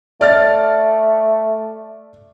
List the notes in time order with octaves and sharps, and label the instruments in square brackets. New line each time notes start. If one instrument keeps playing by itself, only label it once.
[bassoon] A3 [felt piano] D5 F6 A6